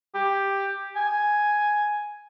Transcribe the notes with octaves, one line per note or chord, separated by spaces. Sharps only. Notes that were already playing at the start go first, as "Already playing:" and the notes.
G4
G#5